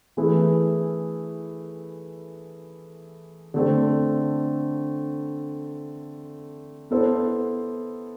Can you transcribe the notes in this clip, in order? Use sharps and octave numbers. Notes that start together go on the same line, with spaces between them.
E3 A3 E4 G#4 B4
D3 A3 C4
B3 E4 A4 C5